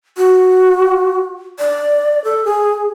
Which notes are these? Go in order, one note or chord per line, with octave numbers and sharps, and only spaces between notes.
F#4
D5
A4
G#4